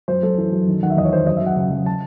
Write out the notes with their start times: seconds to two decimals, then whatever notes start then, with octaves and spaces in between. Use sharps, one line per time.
0.08 F#2 C5
0.23 F#2 A4
0.38 E3
0.52 F#2
0.68 D#3
0.83 D#3 F#5
0.90 E5
0.97 E2 D#5
1.05 C#5
1.12 D#3 C5
1.27 F#2 D#5
1.37 E5
1.42 F#2 F#5
1.56 C#3 F#5
1.71 F#2
1.86 A5